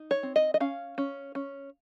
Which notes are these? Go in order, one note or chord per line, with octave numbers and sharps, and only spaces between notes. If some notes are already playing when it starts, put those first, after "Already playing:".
Already playing: D#4
C#5
C4
D#5
D#5
C#4 F5
C#4
C#4